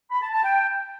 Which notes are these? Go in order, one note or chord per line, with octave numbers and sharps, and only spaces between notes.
B5
A5
A5
G5